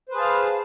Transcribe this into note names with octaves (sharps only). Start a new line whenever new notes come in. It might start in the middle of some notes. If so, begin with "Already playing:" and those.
G#4 B4 C5 F5 A5